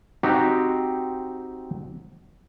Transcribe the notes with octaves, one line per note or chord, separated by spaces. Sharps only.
C4 D#4 F#4 G4 C5